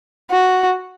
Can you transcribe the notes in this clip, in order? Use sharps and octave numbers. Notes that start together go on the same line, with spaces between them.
F#4